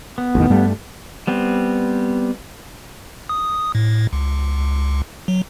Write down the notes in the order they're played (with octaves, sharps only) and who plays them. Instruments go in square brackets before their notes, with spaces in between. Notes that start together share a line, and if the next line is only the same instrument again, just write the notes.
[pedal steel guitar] B3
[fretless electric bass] A1 E2 D#3
G2 G3 A3
[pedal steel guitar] G3 B3 C4
[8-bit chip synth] D#6
A2
C#2
C#2
F#3